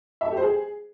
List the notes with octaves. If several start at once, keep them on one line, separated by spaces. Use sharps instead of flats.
E5
A4
G4
C5
G#4